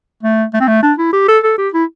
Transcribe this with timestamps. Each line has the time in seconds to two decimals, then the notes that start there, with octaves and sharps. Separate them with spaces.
0.23 A3
0.54 A3
0.60 C4
0.67 A3
0.83 D4
0.98 E4
1.13 G4
1.28 A4
1.44 A4
1.58 G4
1.74 E4